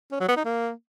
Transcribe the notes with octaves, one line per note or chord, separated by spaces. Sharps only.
C#4
F#3
B3
D#4
A#3